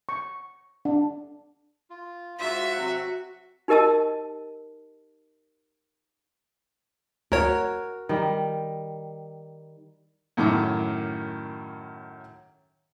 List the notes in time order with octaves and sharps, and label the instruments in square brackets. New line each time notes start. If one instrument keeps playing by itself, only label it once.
[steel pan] C#6
D4
[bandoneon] F4
[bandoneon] G#2 F4 C5 [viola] F#4 [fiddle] E5
[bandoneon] C3 F#3 C4
[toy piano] D#4 G4 A#4 D#5 A5 E6
[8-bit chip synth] D2 C#5 [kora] F#4 A#4
[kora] D#3 G3
[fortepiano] F#2 A2 D#3 D6